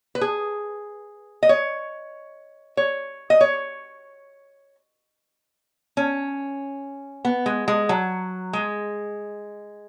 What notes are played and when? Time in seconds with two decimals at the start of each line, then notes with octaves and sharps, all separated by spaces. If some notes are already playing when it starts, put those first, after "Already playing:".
0.15 B4
0.21 G#4
1.43 D#5
1.49 C#5
2.77 C#5
3.30 D#5
3.41 C#5
5.97 C#4
7.25 B3
7.46 G#3
7.68 G#3
7.89 F#3
8.53 G#3